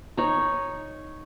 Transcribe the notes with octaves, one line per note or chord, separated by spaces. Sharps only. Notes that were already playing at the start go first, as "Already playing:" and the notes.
D#4 C#5